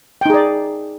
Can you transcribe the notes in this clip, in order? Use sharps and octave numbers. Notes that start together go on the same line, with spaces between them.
D#4 G#4 D5 G5